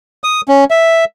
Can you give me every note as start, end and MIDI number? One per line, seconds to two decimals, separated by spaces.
0.24 0.41 87
0.48 0.64 61
0.71 1.05 76